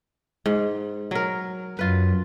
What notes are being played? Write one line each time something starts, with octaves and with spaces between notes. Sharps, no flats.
G#2
F#3 A#4
F#2 F4 B4